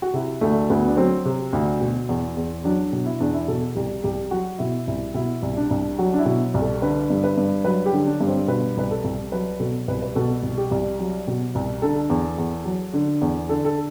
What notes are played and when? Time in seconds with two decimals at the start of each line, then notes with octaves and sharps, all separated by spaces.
0.02 F#4
0.14 C3 E4
0.41 D2 A3
0.70 D2 B3
0.88 D4
0.97 F#3 C4
1.25 C3
1.53 D2
1.81 B2
2.09 E2
2.37 E2
2.64 F#3 D4
2.92 B2
3.06 E4
3.20 E2 D4
3.34 E4
3.48 B2 A4
3.75 C2 G4
4.04 C2 G4
4.31 F#3 F#4
4.59 B2 E4
4.87 C2 E4
5.14 B2 E4
5.42 C2
5.57 D4
5.71 C2
5.99 F#3 F#4
6.13 D4
6.19 E4
6.26 B2
6.54 C2
6.61 A4
6.82 D3 B4
7.10 G2
7.24 B4
7.37 G2
7.65 F#3 B4
7.86 G4
7.93 D3
8.07 D4
8.21 G2
8.27 C4
8.48 B2 B4
8.77 C2 B4
8.91 A4
9.04 C2
9.32 F#3 B4
9.59 B2 A4
9.88 C2 B4
10.02 B4
10.15 B2 A4
10.43 C2
10.57 G4
10.71 C2
11.00 F#3
11.27 B2
11.55 C2
11.82 D3 A4
12.10 E2
12.38 E2
12.65 F#3
12.94 D3
13.21 E2
13.49 D3 A4
13.65 A4